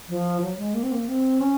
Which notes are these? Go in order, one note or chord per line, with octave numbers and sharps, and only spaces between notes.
F3
F#3
G#3
A#3
C4
A#3
C4
C#4